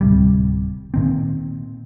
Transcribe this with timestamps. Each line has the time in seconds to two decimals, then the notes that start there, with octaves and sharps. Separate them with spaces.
0.01 D1 C3 G3
0.94 A#2 D#3 C4